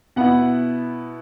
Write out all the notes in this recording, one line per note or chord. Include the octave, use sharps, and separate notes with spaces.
B2 B3 E4 F#5